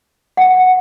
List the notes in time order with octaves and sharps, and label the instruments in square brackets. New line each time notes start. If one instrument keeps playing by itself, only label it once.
[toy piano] F#5